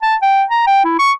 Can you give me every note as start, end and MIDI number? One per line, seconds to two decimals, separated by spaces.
0.02 0.15 81
0.22 0.43 79
0.50 0.66 82
0.67 0.84 79
0.84 0.96 64
0.99 1.11 85